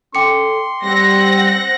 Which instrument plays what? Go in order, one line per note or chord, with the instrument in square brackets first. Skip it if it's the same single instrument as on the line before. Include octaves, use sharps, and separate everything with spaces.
[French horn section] C#4 A4 [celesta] G5 D6 C#7 [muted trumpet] C6
[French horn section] G3 [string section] C4 F#5 A#6